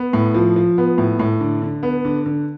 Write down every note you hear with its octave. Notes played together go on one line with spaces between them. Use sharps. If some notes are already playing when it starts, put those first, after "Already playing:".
Already playing: B3
A2
F3
F3
B3
A2
A2
D3
D3
B3
D3
D3